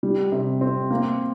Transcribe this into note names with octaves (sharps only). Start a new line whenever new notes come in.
G3
C3
C4
A#3